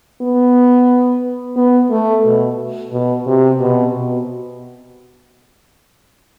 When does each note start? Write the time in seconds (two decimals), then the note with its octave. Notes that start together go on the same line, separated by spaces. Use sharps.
0.22 B3
1.57 B3
1.91 A3
2.25 B2
2.92 B2
3.27 C3
3.60 B2
3.94 B2